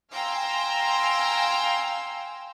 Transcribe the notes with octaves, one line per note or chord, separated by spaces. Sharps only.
F5 G5 G#5 A#5 C6 E6